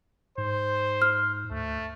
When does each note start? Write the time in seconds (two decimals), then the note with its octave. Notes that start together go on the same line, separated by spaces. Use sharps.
0.38 G#2 C5
1.02 F6
1.51 D2 A3